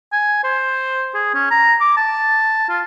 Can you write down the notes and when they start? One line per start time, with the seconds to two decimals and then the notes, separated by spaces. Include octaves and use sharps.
0.12 G#5
0.44 C5
1.15 G#4
1.34 C#4
1.51 A#5
1.81 D6
1.97 A5
2.69 F4